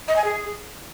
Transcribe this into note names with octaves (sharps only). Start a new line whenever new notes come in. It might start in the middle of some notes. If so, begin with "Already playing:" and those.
D#5
G#5
G#4